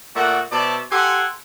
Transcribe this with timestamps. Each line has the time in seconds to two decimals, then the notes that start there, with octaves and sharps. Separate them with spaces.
0.15 A#2 A3 F#4 D5 F#5
0.51 B2 C5 D5 E5 A5
0.91 G4 A4 F#5 G#5 C6